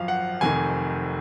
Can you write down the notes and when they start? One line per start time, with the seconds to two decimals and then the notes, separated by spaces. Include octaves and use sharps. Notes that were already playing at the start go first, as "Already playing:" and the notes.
Already playing: G#1 F#2 F3 F5
0.08 F#5
0.41 F1 F2 D#3 G#5